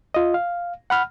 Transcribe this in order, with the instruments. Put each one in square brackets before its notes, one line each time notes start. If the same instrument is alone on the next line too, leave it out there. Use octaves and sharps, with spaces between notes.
[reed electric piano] F4 D#5
F5
F#5 B5 F6